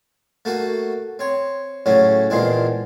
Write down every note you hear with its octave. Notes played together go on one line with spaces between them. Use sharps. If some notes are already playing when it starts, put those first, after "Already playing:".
A3 A#3 F#4
C4 C#5
A2 C#3 F#3 C#4
E2 A#2 F3 G#3 C4